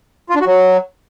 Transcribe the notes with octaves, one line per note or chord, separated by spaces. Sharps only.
F4
D4
F#4
F#3